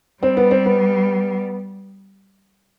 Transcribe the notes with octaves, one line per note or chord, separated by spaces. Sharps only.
G3 C4
B3
C4
B3